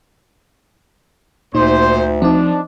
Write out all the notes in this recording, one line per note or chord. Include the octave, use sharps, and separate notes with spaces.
D2 A#2 D#4 C5
F3 C4 D4 D#4